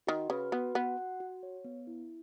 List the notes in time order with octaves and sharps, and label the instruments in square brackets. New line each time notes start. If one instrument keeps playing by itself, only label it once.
[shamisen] D#3 [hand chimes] F#4
[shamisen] C#3 [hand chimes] B4
[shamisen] B3 [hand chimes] F#4
[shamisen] B3 [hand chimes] F#5
[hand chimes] F#4
F#4
C#5
B3
E4